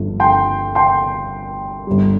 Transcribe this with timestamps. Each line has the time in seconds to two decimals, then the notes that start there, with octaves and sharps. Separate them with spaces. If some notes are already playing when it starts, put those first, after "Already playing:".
Already playing: G1 G2 F3 A3
0.20 G5 C6
0.75 G5 C6
1.87 G1 G2 G3